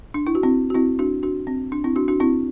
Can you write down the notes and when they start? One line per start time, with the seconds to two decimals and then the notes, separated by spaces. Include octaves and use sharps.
0.14 D4
0.27 E4
0.35 F#4
0.43 C4 E4
0.70 F#4
0.75 C4 E4
0.99 D4 F#4
1.23 D4 F#4
1.47 C4
1.72 D4
1.84 C4 E4
1.96 D4 F#4
2.08 D4 F#4
2.20 C4 E4